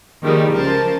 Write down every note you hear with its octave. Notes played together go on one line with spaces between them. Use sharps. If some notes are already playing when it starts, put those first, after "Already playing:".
D#3 F3 G3 G#3 A#3 D#4
C#2 F3 A#4 C5 A5